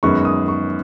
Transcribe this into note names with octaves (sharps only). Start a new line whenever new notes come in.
F#2 D#3 G#3 B3 C#6
D#6
C#6